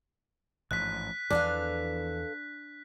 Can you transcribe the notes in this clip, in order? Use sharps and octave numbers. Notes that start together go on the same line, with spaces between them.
A1 G#2 F3 F#6 B6
E2 E3 F3 D4 A4 B4 F5